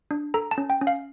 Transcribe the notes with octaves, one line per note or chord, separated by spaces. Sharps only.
D4
A4 A#5
A5
C#4
G5
C#4
F5